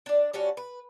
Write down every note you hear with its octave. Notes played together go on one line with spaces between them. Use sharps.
D4 D5
G3 C#4 D4 F#4
B4